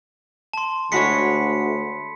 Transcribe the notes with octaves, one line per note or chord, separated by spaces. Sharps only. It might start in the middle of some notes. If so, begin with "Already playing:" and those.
A5 C6
D2 G#3 F#4 C#5 B5 B6 C#7